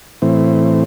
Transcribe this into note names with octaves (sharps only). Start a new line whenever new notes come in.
A2 E3 C4